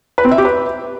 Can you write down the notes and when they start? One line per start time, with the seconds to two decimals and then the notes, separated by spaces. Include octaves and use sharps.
0.18 B4
0.25 C4
0.31 E5
0.38 G4
0.45 B4